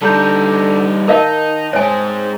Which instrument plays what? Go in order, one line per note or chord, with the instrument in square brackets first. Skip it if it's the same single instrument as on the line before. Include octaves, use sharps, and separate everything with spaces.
[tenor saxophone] D3 [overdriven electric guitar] G3 D#4 [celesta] A5 A#5 G6
[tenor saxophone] D#3 [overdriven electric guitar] D#4 [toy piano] A#4 D#5 F5 [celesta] A5
[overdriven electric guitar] G#2 G#3 [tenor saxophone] C4 [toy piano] C#5 G#5